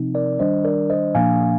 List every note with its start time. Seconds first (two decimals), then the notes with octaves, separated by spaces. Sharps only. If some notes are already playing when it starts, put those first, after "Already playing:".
Already playing: C3 F3 C4 D#4
0.14 A#4 D5
0.39 D#3 G3 D4 C5 D#5
0.65 A#4 D5
0.90 C5 D#5
1.15 A#2 F3 A#3 D4 F5 G#5